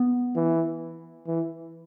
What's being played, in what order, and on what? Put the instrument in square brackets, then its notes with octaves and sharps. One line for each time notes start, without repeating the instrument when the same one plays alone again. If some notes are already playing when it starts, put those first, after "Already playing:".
Already playing: [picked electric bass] B3
[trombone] E3
E3